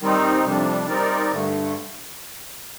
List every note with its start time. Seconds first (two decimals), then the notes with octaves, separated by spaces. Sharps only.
0.01 D#3 G3 C4 D#4
0.45 F2 C3 G3 D4
0.88 G3 C4 D#4 A#4 D5
1.32 G2 D3 A3